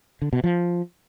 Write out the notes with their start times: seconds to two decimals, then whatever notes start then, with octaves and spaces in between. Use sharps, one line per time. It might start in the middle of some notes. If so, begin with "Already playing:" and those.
0.22 D3
0.33 B2
0.44 F3